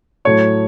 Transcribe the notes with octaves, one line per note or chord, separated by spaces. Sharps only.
A2 F#3 A3 C#5